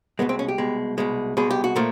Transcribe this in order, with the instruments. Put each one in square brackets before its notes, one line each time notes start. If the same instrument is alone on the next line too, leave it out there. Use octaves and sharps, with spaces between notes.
[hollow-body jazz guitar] C2 B2 G#3 B3
C4
C#4
G4
C2 B2 G#3
C2 B2 G#3
C2 B2 G#3 G#4
G4
F#4
A#2 F3 A3